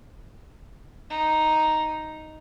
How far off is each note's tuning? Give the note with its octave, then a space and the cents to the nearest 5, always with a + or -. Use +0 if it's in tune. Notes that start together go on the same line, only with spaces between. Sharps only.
D#4 +0